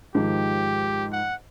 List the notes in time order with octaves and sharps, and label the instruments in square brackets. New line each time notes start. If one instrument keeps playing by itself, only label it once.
[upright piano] G#2 D#3 F3 [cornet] G4
[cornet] F#5